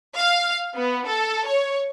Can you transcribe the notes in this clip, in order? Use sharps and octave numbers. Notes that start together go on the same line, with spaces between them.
F5
B3
A4
C#5